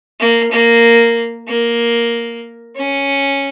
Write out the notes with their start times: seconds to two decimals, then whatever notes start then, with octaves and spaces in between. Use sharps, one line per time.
0.20 A#3
0.51 A#3
1.48 A#3
2.76 C#4